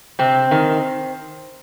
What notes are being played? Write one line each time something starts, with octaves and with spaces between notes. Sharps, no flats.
C3 C4
D#3